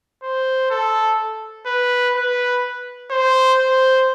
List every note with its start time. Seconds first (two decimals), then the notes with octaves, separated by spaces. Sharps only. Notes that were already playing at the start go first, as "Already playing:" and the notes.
0.23 C5
0.71 A4
1.66 B4
2.15 B4
3.11 C5
3.59 C5